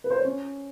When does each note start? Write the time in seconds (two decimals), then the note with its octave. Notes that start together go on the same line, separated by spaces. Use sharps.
0.04 B4
0.11 C5
0.19 C#5
0.25 C#4